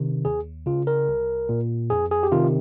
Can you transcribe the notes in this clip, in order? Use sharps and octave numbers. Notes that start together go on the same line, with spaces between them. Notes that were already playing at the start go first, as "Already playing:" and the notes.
Already playing: C3 D#3
D#2 G#4
C#3 F4
A#4
C2
A#2
F2 G#4
G#4
G4
C3 D#3 F4